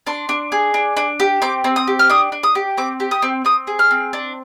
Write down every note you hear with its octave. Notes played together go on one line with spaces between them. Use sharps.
D4 C6
D4
G#4
D4
D4
G4
C4 D6
C4
D#6
G4
F6
D4 D#6
D4
D#6
G4
C4 D6
G4
D#6
C4
C4 D#6
G#4
F6
C4
D4